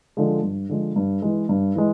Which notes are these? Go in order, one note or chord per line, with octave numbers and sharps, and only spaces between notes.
D3 F3 G#3
G2
D3 F3 G#3
G2
E3 G#3
G2
E3 G#3